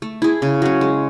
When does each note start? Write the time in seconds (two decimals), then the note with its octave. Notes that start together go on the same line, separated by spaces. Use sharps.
0.02 A3
0.22 E4 G#4
0.42 C#3
0.62 F#3 C#4
0.81 G#3